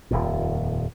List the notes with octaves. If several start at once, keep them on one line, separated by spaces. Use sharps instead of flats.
D#1 F2 A#2